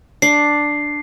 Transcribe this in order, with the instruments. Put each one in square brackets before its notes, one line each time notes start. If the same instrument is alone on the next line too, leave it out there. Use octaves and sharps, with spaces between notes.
[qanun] D4 [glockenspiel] C7